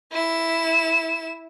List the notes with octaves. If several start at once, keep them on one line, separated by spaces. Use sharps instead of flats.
E4 E7